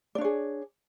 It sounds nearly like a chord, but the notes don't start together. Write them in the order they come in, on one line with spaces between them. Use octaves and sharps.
D5 D4 C#5 G#4